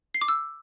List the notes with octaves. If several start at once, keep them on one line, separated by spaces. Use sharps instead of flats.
C7
D6
E6